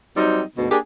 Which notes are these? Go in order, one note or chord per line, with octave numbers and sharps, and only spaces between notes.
F#3 G3 C4 D#4
D2 G#2 B2
A#3 D4 G4 G#4